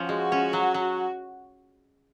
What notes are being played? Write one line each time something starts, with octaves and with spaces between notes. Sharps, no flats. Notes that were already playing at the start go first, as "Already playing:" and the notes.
Already playing: F3 C#4
G#3 F#4
C#4
F#3
F#3